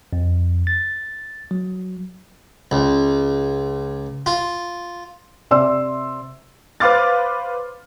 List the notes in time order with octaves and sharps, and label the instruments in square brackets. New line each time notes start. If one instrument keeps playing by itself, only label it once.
[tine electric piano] F2
A6
F#3
[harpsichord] C#2
F4
[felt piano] C3 D5 C6 E6
[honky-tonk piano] B4 C5 F5 D6 F6 A6